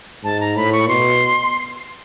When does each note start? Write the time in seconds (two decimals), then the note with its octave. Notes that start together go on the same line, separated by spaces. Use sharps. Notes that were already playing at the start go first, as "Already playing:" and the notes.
0.24 G#2 A5
0.40 A#5
0.56 A2 B5
0.72 C#6
0.88 B2 C6